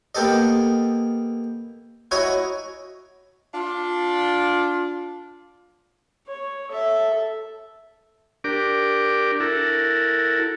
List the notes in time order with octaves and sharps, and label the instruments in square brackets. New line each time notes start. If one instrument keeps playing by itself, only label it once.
[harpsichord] A#3 B3 G4 A4 D#5
E4 F#4 C#5 D#5 G#5 A#5
[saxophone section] D4 F4
[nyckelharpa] C#5
A4 E5
[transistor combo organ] D4 G4 A#4 D6
E4 F#4 A4 A#4